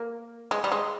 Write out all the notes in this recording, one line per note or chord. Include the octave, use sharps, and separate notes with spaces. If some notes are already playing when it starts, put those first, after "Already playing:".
Already playing: A#3
G#3
G3
G#3